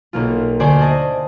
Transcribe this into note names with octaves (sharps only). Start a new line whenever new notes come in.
B1 A#3 F4
D2 C5 D5 G#5 D6
D#5 A5 A#6